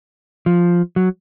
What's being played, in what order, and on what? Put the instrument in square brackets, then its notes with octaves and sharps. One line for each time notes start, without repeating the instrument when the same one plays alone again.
[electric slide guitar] F3
F#3